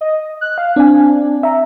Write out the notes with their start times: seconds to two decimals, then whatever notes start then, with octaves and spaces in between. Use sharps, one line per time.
0.01 D#5
0.41 F#6
0.58 F5
0.76 C4 D4 G#5
1.43 E5 A#5